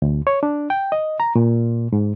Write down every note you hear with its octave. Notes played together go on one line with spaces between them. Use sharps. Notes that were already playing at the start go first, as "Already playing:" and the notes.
D2
C#5
D4
G5
D#5
A#5
A#2
G#2